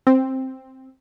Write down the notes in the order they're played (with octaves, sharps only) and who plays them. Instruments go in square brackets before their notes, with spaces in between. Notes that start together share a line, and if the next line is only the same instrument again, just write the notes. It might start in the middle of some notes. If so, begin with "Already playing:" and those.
[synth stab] C4